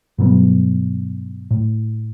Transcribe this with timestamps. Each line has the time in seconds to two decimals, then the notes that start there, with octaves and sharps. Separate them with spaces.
0.18 G2 B2 F#3 B3
1.51 A2